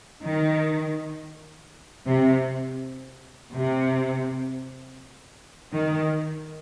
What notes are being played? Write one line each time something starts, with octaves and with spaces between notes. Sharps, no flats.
D#3
C3
C3
D#3